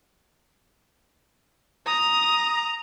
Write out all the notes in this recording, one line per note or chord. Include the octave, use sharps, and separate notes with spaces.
A#5 D#6